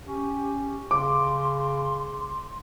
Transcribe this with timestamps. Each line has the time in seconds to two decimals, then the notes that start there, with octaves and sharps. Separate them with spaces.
0.06 C#4 G4
0.91 C#3 C6 D6